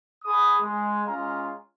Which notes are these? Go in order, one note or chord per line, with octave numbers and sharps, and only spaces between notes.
G#4 B5 D#6
G#3
G#3 C#4 F4 F5 A#5